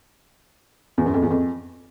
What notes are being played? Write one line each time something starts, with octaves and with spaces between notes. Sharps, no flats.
E2
F#2
F2
E2
F2